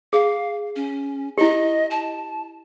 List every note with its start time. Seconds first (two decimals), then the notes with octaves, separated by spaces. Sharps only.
0.13 G#4 F5
0.76 C#4
1.38 E4 G4 D#5
1.91 A5